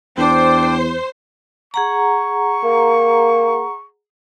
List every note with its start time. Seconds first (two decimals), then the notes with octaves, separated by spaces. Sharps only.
0.18 E2 D4 C5 G5
1.74 G#4 F#5 A#5 C#6
2.64 A#3